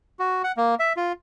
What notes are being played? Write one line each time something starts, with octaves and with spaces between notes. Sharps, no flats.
F#4
F#5
A#3
E5
F4